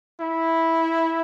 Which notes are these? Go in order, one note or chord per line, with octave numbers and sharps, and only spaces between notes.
E4